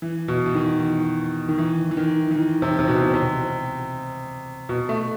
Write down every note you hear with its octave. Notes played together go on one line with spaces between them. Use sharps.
E3
B2
E3
D#3
D#3
E3
E3
D#3
E3
D#3
C3
D#3
C3
B2
C3
B2
A3